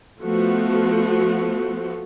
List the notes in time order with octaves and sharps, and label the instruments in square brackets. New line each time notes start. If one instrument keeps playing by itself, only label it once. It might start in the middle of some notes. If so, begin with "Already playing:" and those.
[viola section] F3 A3 B3 F#4